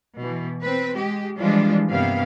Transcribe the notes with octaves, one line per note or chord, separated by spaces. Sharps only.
B2 E3
C4 B4
G#3 G4
E3 F3 G3 G#3 D4 F4
G2 C3 A#3 B3 F5